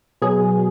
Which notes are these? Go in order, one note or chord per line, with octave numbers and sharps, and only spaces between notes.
B2 F#3 G#4